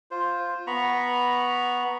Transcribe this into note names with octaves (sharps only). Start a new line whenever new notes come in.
F4 C5
B3 A#5 B5 C#6